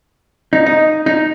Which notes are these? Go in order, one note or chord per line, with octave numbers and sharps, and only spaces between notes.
D#4
D#4
D#4